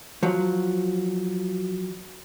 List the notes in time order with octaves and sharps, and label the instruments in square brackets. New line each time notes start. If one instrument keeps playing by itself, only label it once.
[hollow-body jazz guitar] F3 F#3